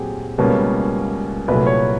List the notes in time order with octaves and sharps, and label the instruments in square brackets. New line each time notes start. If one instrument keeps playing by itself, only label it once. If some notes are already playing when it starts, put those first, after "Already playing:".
Already playing: [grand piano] A#2 F#3 A3 C4 G4 G#4
C#2 B2 G3 A#3 C#4
C2 A#2 F#3 A3 B4
C#5